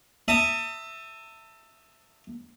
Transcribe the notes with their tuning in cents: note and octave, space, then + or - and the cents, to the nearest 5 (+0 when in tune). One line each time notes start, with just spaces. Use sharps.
E5 +0 A5 +35 D#6 +5